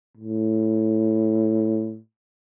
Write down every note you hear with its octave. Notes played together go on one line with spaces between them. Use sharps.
A2